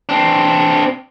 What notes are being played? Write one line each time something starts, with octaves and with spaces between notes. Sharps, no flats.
C4 D4